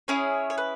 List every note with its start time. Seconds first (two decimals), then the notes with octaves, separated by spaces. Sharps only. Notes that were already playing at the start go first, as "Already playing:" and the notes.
0.08 C#4 E4 G#4 C#5
0.50 C#5
0.58 B4